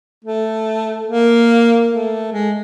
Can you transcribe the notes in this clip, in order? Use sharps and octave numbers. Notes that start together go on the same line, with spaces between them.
A3
A#3
A3
G#3